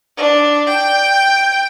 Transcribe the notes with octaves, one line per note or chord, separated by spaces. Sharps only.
D4
G5